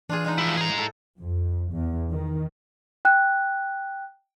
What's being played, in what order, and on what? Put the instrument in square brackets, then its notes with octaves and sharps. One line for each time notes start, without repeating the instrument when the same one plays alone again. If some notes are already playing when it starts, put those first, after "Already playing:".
[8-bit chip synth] E3 [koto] D4 F4 G#4
[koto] G#3 B3 D#4
[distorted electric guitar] F3 E4
[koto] A2 [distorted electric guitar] G#4 A#5
[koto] A2 A4
[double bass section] F2
E2
D#3
[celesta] G5 F#6